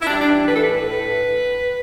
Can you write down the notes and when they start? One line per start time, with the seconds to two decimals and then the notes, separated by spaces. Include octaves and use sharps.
0.01 E4
0.07 G3 D4
0.20 D4
0.27 E3
0.34 D4
0.47 A2 B4
0.56 A4
0.63 B4
0.68 A2
0.88 A2